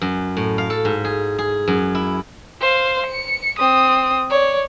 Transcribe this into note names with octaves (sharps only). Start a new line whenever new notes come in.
F#2
A2
F5
A4
G#2
G#4
G#4
F#2
E4
C5 F5
C#7
C4 D#6
C#5 D5